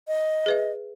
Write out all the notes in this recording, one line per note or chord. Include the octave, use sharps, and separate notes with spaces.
D#5
G#4 B4 E5